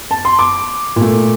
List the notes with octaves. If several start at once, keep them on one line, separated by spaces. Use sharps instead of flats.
A5
C6
D6
A#2 A3